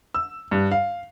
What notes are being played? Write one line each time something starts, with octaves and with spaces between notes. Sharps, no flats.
E6
G2
F5